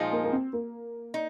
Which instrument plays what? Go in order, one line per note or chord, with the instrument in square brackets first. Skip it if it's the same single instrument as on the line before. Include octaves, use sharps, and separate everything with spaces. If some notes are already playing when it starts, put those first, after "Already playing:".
Already playing: [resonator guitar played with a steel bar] A#2 F3 G#3 D#4
[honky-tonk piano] A#3
A#3
C4
A#3
[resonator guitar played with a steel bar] D#4